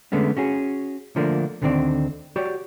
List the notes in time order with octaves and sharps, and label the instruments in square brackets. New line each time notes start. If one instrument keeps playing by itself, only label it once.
[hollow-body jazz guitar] D3 G#3 A3 B3 C#4
C#4 F#4 G#4
D3 F3 A3 A#3 D4
D2 D3 D#3 C4 D5
F#4 G4 C#5 D5